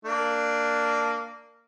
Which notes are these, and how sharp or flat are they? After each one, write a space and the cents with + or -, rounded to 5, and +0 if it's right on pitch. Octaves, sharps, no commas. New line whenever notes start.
A#3 -10 D4 +5